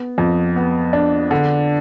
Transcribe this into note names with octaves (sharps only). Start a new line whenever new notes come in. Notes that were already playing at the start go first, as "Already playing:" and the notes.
Already playing: B3
F2
B3
D4
D3